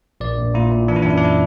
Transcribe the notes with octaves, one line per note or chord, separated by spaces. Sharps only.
A#1 D5
A#1
A#2 E4
A#2
E3 D4
E4
D4
F#2
E4
D4
E4